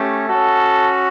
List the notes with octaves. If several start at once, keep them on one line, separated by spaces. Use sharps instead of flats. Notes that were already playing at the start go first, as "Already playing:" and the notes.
Already playing: A3 C#4 G4
C#4 F#4 A4